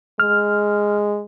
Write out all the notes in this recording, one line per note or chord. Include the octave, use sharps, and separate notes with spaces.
G#3 F6